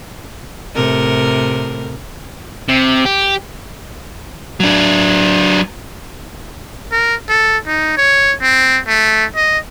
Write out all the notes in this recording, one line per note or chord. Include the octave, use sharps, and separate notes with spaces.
A2 C3 A#4
C3
G4
F#3 D4
A#4
A4
D#4
C#5
C4
A3
D#5